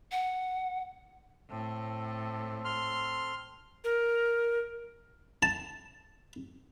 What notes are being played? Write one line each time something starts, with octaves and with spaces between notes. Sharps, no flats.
F#5
A2 C4 A4
C6 F6
A#4
A5